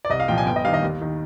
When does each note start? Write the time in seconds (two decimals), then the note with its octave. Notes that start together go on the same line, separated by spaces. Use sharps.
0.05 D5
0.10 C2 D#5
0.20 F5
0.28 A#2 F3 G5
0.38 G#5
0.46 G1 G5
0.56 D#5
0.64 G2 D#3 F5
0.74 D#5
0.83 D#2
1.01 D#3